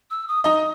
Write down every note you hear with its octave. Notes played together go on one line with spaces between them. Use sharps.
E6
D#6
D#4 D#5 D#6